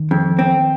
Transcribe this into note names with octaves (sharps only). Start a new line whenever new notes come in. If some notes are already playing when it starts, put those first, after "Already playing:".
Already playing: D#3
F2
C4